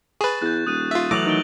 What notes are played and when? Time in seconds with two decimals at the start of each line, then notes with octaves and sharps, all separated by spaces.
0.21 G#4 B4 C#6 A6
0.42 E2 F#6 G6
0.67 D#1 D#6 F#6 D#7
0.91 F4 E5
1.11 A2 E3 F#3 A3 D6 A#6 F7 F#7
1.26 D#3 F#6 D7 G7